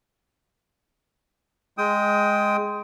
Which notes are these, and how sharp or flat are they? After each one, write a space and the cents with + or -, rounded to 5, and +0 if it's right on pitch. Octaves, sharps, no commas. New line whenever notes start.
G#3 +0 G5 +0 D#6 +25